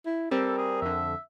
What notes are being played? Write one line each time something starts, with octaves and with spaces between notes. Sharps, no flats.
E4
G3 C4 A4 A#4
G#4
F2 D3 E5